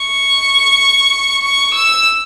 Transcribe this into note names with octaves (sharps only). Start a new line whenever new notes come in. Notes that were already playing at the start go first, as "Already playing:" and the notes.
Already playing: C#6
C#6
E6